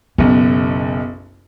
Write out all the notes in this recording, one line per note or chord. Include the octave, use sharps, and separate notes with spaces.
F#1 B1 B3